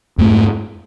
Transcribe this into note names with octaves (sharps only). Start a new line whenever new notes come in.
F2 G#2 A3